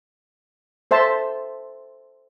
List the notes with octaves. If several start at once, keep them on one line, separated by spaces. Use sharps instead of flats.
A4 C5 E5 A5